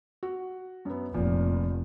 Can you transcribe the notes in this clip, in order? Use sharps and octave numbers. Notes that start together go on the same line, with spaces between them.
F#4
F#2 B3
F1 A#2 F3